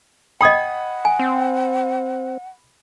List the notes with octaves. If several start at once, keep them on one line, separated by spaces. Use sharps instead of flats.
D#5 F#5 G5 B5 D#6 G#6
G#5
C4